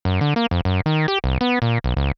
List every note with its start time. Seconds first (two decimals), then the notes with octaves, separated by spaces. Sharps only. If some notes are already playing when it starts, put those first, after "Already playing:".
0.05 F#2
0.21 D3
0.36 A#3
0.51 F2
0.65 F#2
0.86 D#3
1.08 G4
1.24 C2
1.41 B3
1.62 A#2
1.84 B1
1.97 C#2